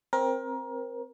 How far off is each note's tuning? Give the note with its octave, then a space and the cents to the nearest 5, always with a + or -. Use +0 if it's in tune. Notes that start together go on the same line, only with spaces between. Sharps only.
C4 +10 A#4 +25